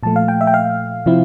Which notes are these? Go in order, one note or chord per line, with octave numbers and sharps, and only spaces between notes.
A#2 F3 A3 A5
F5
G5
E5
G5
F5
C3 F3 C4 E4